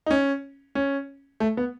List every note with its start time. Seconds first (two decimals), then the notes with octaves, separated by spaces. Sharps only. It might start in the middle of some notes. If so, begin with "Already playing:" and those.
0.06 D#4
0.11 C#4
0.75 C#4
1.40 A3
1.57 B3